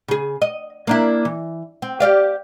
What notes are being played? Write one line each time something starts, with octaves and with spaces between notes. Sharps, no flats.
C#3 G#4
D#5
A#3 D4 E4
E3
C4
G4 D5 F5